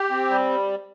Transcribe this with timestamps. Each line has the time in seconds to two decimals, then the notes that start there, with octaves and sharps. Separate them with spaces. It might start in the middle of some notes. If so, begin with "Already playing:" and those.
Already playing: G4
0.11 C4
0.30 G3